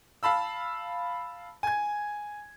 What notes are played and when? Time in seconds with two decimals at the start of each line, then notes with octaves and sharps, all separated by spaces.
0.23 F5 A5 B5 E6
1.63 G#5 G#6